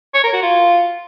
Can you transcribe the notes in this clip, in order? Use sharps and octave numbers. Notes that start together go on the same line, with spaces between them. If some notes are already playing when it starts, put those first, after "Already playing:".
C#5
A#4
F#4
F4